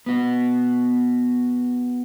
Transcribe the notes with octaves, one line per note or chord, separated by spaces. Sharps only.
B3 F#4